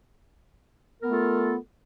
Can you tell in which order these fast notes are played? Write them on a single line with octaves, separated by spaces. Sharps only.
A#4 B3 A3 F4 A4